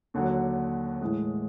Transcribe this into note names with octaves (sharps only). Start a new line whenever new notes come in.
D#2 D3 F#3
A2 E3 G#3